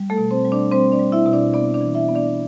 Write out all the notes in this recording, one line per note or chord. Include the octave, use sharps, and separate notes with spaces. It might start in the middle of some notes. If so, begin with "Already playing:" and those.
Already playing: G3
A3 A4
B2
C4 C5
G3
D4 D5
G3 C4 C5
D4 D5
G3
E4 E5
B2
D4 D5
B3 D4 D5
D4 D5
E3
E4 E5
B3
D4 D5